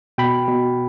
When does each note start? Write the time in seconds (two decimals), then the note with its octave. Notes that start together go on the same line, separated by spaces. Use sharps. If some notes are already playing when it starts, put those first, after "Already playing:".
0.18 B2 G5 B5
0.48 B2